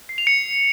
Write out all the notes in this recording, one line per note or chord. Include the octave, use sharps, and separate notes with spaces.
C7
F7
C#7